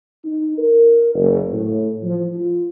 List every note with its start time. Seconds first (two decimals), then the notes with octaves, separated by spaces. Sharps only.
0.24 D#4
0.58 A#4
1.15 F#1
1.51 A2
2.03 F3
2.35 F4